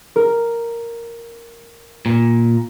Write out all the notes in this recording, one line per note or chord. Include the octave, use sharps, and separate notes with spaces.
A#4
A#2